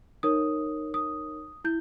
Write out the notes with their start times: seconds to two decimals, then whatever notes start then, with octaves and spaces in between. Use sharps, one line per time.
0.23 D#4 A#4 C#5 D#6
0.94 D#6
1.64 E4 G6